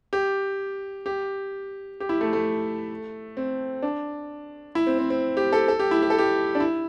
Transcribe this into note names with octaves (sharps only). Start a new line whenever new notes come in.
G4
G4
G4
E4
A3
A3
C4
D4
E4
C4
C4
C4
G4
A4
A4
G4
E4
G4
A4
G4
D4
E4